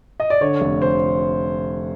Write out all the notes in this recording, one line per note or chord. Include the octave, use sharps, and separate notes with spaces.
D#5
D5
D3 C#5
F1
C5